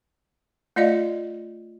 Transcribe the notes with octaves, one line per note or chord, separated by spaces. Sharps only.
A3 F4 D5 D#5 F5